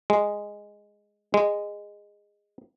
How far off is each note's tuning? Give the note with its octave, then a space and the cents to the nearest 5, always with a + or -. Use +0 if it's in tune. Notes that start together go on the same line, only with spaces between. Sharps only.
G#3 -5
G#3 -15